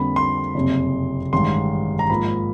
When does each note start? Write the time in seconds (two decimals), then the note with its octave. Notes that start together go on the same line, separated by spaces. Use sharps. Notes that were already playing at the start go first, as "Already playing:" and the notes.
Already playing: F2 D3 G3 A#3 B5
0.16 C6
0.55 F#1 F2 C3
1.32 A1 G2 D#3 G#3 C6
1.99 A#5
2.10 G#2 F3 A#3 B5